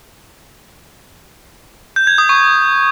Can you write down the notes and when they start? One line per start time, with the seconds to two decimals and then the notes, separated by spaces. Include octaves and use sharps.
1.96 G6
2.07 G#6
2.18 D#6
2.29 C#6